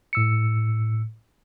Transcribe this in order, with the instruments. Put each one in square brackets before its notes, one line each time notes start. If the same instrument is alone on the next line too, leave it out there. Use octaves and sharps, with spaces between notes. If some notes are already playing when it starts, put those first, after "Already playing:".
[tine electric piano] A2 E6 C#7